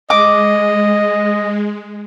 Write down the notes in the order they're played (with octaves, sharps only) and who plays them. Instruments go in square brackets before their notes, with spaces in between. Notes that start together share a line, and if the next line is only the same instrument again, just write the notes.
[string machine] G#3 [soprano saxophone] D#5 [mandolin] D6